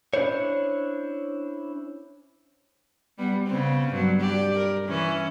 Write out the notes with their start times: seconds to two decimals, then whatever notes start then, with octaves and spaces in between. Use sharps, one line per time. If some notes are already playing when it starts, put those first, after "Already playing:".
0.14 C#4 D4 E4 C5 C#5
3.18 G3 B3
3.47 C#3 B3 C4
3.91 G2 F#3
4.21 G4 D5
4.58 A#4
4.88 E3 C#4